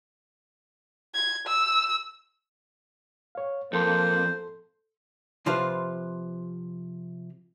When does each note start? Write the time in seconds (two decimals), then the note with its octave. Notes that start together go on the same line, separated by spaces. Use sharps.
1.15 G#6
1.47 E6
3.35 C#5 F5
3.73 F2 A#3 A4 C5 C6
5.46 C3 F3 F4 B4 C5 F5